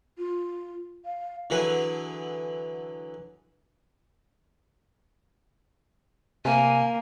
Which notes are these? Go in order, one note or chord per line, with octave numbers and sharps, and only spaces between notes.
F4
F5
D3 E3 F#3 G#4 B4
C3 A#3 G#5